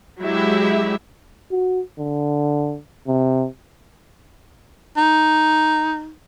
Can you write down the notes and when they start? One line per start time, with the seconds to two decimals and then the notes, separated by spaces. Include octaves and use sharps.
0.22 F#3 G#3 E4 G4 E5
1.51 F#4
1.98 D3
3.07 C3
4.97 D#4